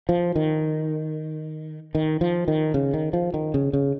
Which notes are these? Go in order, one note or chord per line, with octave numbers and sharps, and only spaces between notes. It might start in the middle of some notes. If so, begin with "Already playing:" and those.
F3
D#3
D#3
F3
D#3
C#3
D#3
F3
D#3
C#3
C#3